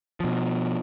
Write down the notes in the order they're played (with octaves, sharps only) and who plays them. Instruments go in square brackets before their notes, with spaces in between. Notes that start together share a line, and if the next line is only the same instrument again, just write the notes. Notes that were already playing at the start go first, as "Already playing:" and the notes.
[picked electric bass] B2 F3